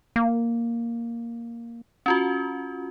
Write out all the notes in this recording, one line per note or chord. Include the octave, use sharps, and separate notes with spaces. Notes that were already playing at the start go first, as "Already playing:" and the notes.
A#3
C#4 F4 F#4